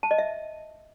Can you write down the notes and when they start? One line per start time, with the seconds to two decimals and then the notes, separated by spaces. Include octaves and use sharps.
0.03 A5
0.11 D#5
0.18 E5